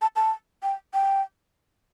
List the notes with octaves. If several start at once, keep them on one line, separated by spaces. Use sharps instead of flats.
A5
A5
G5
G5